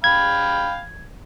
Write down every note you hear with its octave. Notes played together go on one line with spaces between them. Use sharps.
F5 G5 B5 G#6